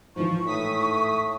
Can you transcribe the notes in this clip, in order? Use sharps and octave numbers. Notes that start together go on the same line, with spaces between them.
G#2 E3 F3 C#6
A2 D#6 B6